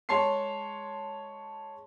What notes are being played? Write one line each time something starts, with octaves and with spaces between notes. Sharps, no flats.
G#3 C#5 A5 C6 C7